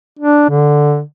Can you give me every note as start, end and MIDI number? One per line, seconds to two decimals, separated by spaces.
0.19 0.47 62
0.50 1.02 50